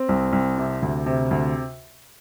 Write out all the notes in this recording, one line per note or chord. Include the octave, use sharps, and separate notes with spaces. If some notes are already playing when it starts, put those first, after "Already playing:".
Already playing: C4
C2
C2
C3
D2
C3
D2